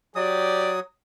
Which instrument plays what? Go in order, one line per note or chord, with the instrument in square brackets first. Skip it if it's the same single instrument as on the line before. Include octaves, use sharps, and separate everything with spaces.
[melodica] F#3 D#6 [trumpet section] G4 D5